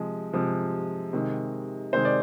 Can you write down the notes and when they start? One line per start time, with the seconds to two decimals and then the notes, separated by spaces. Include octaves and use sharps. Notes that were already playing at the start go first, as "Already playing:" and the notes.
Already playing: C3 F3 G#3
0.33 C3 F3 G#3
1.13 C3 D#3 G#3
1.93 C3 D#3 G#3 C5
2.05 D5